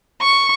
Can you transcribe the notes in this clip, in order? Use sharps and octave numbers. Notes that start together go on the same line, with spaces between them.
C#6